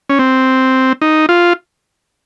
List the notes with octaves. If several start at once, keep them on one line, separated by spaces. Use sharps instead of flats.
C#4
C4
D#4
F4